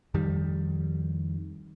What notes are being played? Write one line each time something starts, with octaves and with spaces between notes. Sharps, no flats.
F2 D#3 G3